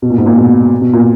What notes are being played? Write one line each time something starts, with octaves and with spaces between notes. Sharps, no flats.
B2
A#2
G#2
A#2
B2
B2
A#2